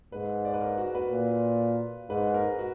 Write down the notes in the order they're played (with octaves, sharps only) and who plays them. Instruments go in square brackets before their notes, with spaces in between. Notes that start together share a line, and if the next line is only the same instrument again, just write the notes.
[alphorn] G#2 [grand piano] B4
[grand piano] D5
B4
A#4
F#4
B4
[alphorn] A#2
[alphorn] G#2 [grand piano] B4
[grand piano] A#4
F#4